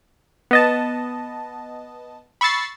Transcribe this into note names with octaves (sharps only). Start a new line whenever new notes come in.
B3 D#5 A5
B5 C#6 E6 A6 C7